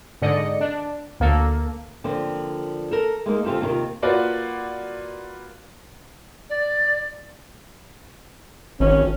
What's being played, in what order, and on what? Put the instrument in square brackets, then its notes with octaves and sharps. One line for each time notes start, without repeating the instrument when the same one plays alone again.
[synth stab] G#2 D3 D5 D#5 C#7
D4
D2 A#3 A4
[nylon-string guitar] D3 F3 A#3 C4
A4 A#4
G#3 A#3 D#4 A#4
C#3 C4 F4 G4 A4
D#2 C3 E4 F4 A#4
[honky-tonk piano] A#3 F4 F#4 B4 D5 F#5
[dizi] D5
[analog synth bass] G#1 [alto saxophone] C#4